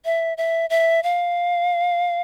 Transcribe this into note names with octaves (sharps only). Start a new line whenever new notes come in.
E5
E5
E5
F5